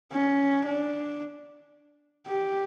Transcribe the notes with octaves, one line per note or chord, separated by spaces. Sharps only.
C#4
D4
G4